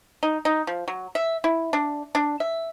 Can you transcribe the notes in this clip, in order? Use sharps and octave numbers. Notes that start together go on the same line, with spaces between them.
D#4
D#4
F3
F#3
E5
E4
D4
D4
E5